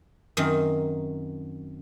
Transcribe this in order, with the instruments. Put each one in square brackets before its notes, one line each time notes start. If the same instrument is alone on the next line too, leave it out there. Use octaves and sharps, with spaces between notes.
[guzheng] F#2 D#3 C4